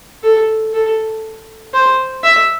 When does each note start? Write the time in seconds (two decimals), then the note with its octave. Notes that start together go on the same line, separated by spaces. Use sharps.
0.23 A4
0.74 A4
1.74 C5
2.24 E5